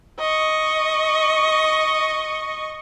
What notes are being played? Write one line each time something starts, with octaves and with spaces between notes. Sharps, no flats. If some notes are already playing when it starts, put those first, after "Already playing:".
D#5 C#6